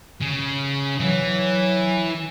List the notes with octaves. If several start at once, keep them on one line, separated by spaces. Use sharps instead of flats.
C#3
E3 F#3